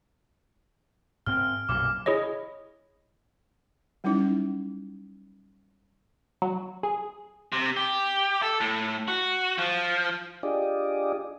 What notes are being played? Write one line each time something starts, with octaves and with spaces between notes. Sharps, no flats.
G#2 C4 F6
B1 F#2 A#2 D6
E4 G#4 C#5 D#5
F#3 G3 C#4 D#4 E4
F#3
G#4
C3
G4
A4
A2
F#4
F3
D4 F4 G4 G#4 D5 D#5